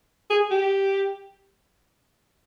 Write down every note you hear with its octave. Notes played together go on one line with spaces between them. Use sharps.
G#4
G4